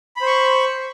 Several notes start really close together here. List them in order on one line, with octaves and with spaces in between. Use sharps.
B5 C5 C#6